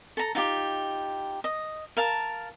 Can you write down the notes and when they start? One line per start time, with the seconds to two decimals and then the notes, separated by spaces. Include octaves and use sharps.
0.17 A4 A#5
0.35 D#4 F4 G4
1.44 D#5
1.97 A#4 F5 A5